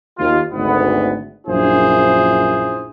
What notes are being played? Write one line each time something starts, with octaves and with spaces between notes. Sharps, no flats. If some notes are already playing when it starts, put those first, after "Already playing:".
D#2 F4
G#1 D2 B3
A#1 F#2 D4 E4 G#4 C5